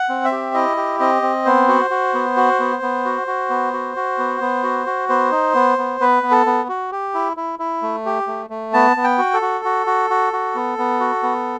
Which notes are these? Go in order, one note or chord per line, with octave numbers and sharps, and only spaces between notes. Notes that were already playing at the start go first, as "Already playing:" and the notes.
Already playing: F#5
C4
E5
G4
E4 D#5
G4
C4 D#5
C4
B3 C5
F#4
F#4
B3
F#4
B3
B3
F#4
F#4
B3
F#4
F#4
B3
B3
F#4
F#4
B3 C5
D#4
B3
B3
B3 B4
B3
A4
B3
F#4
G4
E4
E4
E4
A3
G4
A3
A3
B3 A5
B3
G5
F#4
A4
F#4
F#4
F#4
F#4
F#4
B3
B3
F#4
B3